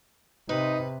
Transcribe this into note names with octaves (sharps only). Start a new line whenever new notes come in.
C3 D#4 B4